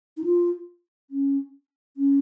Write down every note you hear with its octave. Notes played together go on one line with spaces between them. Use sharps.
D#4
F4
C#4
C#4